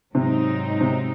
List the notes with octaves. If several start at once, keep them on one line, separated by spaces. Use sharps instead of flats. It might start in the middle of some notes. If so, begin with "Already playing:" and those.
G#2 C3 F#3 C4 D#4
C3